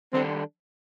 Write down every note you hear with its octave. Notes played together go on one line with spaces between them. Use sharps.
D#3 G3 C4 D4 A4